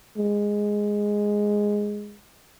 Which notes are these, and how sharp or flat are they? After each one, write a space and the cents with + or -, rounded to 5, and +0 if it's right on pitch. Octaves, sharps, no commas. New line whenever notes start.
G#3 -5